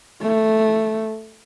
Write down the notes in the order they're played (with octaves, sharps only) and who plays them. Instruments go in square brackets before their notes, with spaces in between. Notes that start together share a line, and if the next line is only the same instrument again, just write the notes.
[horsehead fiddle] A3